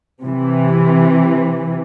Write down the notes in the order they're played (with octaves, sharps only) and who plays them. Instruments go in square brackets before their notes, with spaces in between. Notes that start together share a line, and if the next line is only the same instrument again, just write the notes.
[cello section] C3 E3